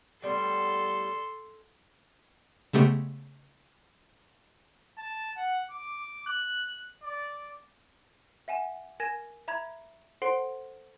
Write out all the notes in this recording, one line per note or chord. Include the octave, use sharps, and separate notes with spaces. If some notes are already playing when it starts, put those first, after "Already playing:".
A2 G3 B3 A4 C6
C#3 G#3 A3 B3 G4
A5
F#5
D6
F#6
D5
E5 F#5 G#5 E7
A#4 G#5 G#6 A#6 D#7 E7
E5 A#5 B5 G#6
A4 C5 F#5 C6 C7 D7